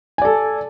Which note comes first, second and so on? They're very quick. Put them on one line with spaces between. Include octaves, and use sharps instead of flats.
G#5 D5 A4